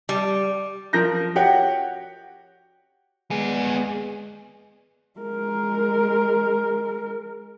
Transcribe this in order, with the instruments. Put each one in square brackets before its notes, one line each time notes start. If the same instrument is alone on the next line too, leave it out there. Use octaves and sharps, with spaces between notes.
[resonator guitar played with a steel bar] G3
[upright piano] F3 A#4 G6 A#6
F#4 G4 C#5 F#5
[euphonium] G#3 [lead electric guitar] B3 G#5
[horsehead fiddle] G#3 A#4